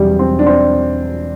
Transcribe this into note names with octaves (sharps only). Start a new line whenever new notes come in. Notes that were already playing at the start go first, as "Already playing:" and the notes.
Already playing: E1 E2 C3 F#3 G3
C4
D4
C4